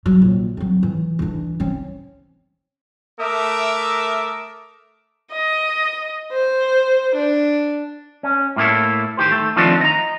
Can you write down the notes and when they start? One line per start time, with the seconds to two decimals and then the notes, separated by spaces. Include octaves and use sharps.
0.06 F#3
0.22 A#1
0.57 F#3 C4
0.83 E3
1.19 E3 D4
1.60 C4 C#4
3.20 A3 A#4 E5 D6 D#6
5.32 D#5
6.33 C5
7.15 D4
8.23 C#4
8.56 A2 A#3 E4 A4
9.17 D#3 G4 C5
9.32 A3
9.56 D#3 F3 A3 C4 D4
9.81 D#5 A#5